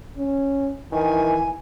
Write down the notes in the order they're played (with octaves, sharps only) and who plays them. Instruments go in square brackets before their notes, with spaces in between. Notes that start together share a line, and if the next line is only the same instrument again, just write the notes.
[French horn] C#4
[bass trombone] D#3 [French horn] E3 [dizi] G#5